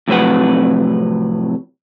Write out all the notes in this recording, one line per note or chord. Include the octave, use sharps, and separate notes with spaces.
F2 A2 C3 F#3 B4 F#5